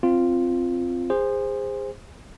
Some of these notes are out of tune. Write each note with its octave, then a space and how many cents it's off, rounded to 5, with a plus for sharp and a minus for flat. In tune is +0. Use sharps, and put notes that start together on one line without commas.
C4 +0 F4 -5
G#4 -30 C5 +0